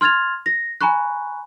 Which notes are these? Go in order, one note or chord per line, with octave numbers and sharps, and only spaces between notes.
C6 F6 G#6 A6 F7
A#6
G#5 A#5 B5 C#6 F#6